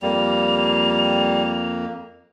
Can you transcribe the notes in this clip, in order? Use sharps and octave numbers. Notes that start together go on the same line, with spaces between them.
F2 G3 A#3 F7